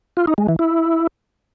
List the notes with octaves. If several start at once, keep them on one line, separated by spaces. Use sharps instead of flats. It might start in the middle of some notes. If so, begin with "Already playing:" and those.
F4
D#4
G#3
E3
E4